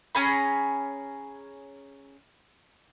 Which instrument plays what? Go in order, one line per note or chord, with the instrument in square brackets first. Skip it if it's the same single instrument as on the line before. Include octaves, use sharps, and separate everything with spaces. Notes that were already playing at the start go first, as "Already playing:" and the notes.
[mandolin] C#4 G#4 A#5 B5